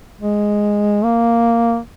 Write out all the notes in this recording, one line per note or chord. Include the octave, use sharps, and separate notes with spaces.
G#3
A#3